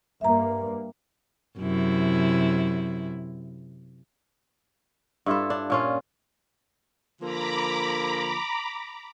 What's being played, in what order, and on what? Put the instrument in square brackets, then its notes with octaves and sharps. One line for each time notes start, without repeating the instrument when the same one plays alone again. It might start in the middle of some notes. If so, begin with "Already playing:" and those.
[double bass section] G2 A#3 [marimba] E5 A#5
[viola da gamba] F#2 C3 E4
[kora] G2 E4 F4 A4
D4
A#2 C#4 F4
[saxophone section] D3 F3 A#3 [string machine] A#5 B5 D6